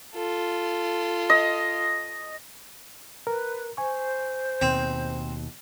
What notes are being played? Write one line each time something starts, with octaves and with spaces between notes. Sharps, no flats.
F4 A4
D#5
A#4 B4
C5 G#5 C#6
D#2 B2 C4